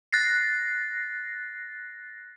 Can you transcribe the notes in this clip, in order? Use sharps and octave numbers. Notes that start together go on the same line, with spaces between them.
F#6 A6 A#6 C7